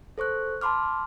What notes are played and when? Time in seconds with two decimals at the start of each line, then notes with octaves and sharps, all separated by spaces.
0.18 A4 C5 C#6 F#6
0.61 A5 B5 C6 D6 F6